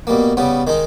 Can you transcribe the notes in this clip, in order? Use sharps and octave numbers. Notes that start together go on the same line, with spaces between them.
B2 G3 A#3
C#3 G3 B3
D#3 G#3 D#4